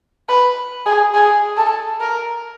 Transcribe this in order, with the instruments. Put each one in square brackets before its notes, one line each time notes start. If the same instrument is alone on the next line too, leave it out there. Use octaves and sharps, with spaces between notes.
[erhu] B4
G#4
G#4
A4
A#4